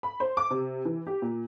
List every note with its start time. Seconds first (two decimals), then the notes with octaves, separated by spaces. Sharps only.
0.03 B5
0.20 C5
0.37 D6
0.51 C3
0.85 E3
1.07 G4
1.22 A#2